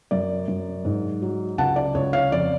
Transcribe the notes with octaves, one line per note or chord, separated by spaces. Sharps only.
F#2 D5
F#2
G#2
F#3
C#2 F#5 A5
D5
C#2 C#5
C#5 F5
F2 D5